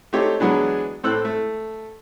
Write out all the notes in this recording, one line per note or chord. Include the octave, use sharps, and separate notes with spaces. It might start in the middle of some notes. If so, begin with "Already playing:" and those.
A3 C4 D#4 G4 C#5
E3 F#3 G#3 B3 D4
A2 C4 A4 E6 F#6
A3